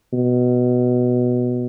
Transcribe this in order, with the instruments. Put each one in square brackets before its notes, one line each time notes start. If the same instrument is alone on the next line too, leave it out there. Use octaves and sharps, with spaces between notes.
[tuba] B2